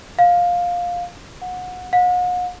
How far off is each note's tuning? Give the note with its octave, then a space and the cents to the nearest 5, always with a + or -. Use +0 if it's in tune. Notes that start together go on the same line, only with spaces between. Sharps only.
F5 +15
F#5 -25
F#5 -45